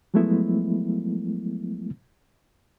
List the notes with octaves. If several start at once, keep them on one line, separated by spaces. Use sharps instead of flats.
F3 F#3 G#3 A3 B3 E4